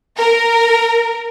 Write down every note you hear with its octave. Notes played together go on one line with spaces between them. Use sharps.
A#4